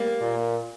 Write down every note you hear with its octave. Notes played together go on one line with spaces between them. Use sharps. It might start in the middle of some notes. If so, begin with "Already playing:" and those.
Already playing: G3 A#3
A#2